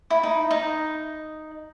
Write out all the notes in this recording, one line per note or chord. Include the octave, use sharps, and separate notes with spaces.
E4
D#4
D#4